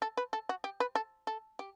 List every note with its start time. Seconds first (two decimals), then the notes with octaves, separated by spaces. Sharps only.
0.02 A4
0.17 B4
0.33 A4
0.49 F#4
0.64 G4
0.80 B4
0.95 A4
1.27 A4
1.59 G4